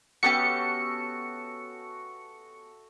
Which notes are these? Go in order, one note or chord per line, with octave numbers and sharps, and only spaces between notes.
B3 C#4 F#4 G4 A4 E5 C#7